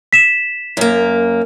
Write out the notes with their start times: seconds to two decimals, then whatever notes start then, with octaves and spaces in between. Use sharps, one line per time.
0.13 B6 E7
0.77 F#2 A#3